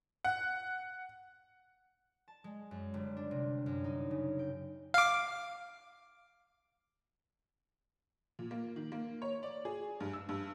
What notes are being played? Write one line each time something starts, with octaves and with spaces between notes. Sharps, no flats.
F#5
A5
G#3
F#2
G1
D4
C3
F#2
D#4
C#3
G5
F5 D6
A#2
A#3
D#3
A#3
C#5
D5
G#4
G2
E6
G2